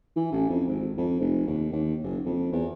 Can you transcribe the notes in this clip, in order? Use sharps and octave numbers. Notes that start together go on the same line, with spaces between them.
E3
A1
F2
G#1
F2
F1
D#2
D#2
F#1
F2
E2